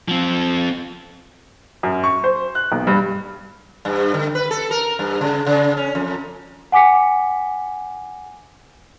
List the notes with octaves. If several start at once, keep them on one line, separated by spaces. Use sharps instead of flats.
F3 C4
F#2
C#6
C5
F#6
B1
G2
G2
D3
B4
A4
A#4
G2
C#3
C#3
C#4
F2
F#5 G#5 D6 B6 C#7